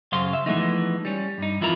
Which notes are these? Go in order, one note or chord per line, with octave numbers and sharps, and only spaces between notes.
F#2 C#3 C5 F5 C6
E5
E3 F3 G#3 A3 B3 D#4
G3 C#4
G2 D#4
F2 E3 E4 F4 A#4 A#5